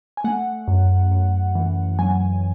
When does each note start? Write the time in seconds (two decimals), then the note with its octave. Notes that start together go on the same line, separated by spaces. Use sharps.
0.17 G#5
0.24 A3 F#5
0.68 F#2
1.11 F#2
1.55 E3
1.99 F#3 G#5